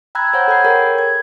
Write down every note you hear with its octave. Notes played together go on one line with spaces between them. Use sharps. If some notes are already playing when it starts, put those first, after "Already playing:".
G5 A#5 B5 E6 F#6 G#6
C5 C#5 F#5 A#5 G6
A4 B5 G6 G#6 C7
G#4 A#4 C#5 G5
G#6